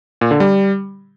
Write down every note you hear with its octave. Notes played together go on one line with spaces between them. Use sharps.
A#2
D3
G3